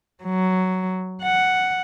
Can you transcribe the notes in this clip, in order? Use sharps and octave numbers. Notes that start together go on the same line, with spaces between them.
F#3
F#5